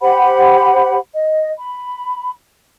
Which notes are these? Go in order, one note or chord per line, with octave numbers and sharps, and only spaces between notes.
G4 C5 F#5 B5
D#5
B5